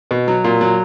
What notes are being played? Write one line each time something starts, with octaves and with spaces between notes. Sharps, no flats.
B2
F#3
A#2
F#3